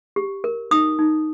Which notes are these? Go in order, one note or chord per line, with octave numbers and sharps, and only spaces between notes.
G4
A#4
D#4 D#6
D#4